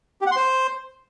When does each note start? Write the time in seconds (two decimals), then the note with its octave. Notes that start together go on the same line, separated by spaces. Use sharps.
0.21 G4
0.26 F#5
0.31 C6
0.36 C5